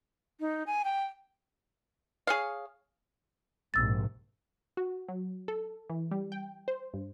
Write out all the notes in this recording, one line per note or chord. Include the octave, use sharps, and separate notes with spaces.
D#4
G#5
G5
G#4 C#5 F5
A#1 G#2 C3 E6 A6
F#4
F#3
A4
E3
G3
G5
C5
G2